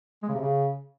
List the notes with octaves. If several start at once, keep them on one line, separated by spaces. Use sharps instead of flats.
G#3
C#3
C3
C#3